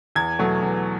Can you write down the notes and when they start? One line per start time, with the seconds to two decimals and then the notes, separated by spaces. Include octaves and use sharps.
0.15 E2 G#6
0.39 B2 F#3 A3
0.62 E2